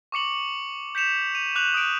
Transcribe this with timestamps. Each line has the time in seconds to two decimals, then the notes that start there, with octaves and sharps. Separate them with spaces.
0.12 C#6 D6 C#7 F#7
0.33 F#7
0.95 G6 B6 C#7 E7 F7
1.35 D#7 F7
1.55 D6 F#6 F7 F#7
1.74 D#6 D7